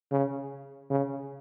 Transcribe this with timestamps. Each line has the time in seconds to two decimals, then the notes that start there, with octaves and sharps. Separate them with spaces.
0.12 C#3
0.90 C#3